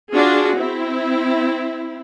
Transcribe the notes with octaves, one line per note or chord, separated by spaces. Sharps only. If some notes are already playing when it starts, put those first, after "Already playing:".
D4 F4 F#4 G#4
C4 E4